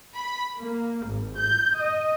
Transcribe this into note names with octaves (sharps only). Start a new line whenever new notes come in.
B5
A#3
G#1
G6
D#5